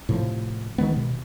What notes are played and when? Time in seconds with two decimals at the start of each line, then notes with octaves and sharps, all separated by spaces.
0.09 A2 C3 F3
0.78 D#3 F3 G#3 B3
0.96 B2